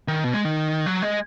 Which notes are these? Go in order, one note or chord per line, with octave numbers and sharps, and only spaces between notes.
D#3
B2
G#3
D#3
F#3
G#3